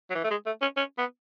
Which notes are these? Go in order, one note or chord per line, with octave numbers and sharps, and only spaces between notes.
F#3
E3
A3
G#3
A3
C#4
C#4
B3